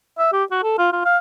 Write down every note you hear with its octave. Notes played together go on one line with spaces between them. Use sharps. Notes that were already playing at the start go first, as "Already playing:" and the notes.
E5
G4
F#4
A4
F4
F4
F5